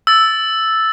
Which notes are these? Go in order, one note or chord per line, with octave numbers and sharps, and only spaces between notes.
E6 A6